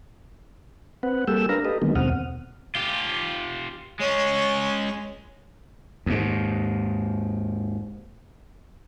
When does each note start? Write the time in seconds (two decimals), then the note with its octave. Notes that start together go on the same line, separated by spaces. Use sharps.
1.03 C4 B4 F#5
1.27 G3 A#3 G#4 A4 G5 E6
1.49 D4 A#4 B4 F5 A#5
1.65 G4 A4 B4 D#5
1.82 D3 D#3 F#3 G#3 A#3 B3
1.95 D#2 B2 C4 F#5 D#6 F6
2.75 F4 G4
4.00 G#3 C#4 C#5
6.06 D#2 G#2